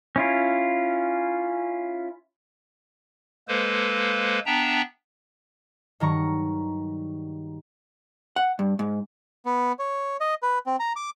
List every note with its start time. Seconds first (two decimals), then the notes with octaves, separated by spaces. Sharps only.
0.16 C#4 E4 F4
3.48 G#3 A#3 A4 B4 C5
4.46 B3 D4 E5 G5 A5 A#5
6.00 G2 D#3 F#3 A#5 C#6
8.36 F#5
8.59 G2
8.79 G#2
9.46 B3
9.79 C#5
10.21 D#5
10.43 B4
10.66 C4
10.80 A#5
10.96 D6